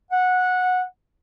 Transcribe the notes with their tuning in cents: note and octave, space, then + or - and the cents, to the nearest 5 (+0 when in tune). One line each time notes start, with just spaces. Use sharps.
F#5 -15